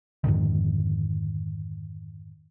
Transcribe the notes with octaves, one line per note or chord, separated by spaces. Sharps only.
F2 G#2 D3 D#3